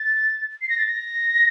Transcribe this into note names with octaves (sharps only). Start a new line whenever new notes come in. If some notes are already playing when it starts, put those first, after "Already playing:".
Already playing: A6
C7
A#6
A6
A#6